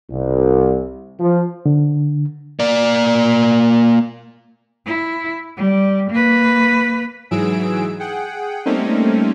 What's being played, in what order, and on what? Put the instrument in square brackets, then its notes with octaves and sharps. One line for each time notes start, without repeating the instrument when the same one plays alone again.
[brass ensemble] C2
F3
[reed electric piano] D3
[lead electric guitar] A#3 D5
[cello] E4
G3
A#3 B4
[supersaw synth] G#2 E3 F#3 G#4 E6 D7
G#4 F#5 G5
G3 A3 A#3 C4 C#4 D#4